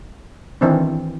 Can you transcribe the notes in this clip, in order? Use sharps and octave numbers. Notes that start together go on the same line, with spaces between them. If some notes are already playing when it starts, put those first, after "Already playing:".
D#3 E3 C4 D4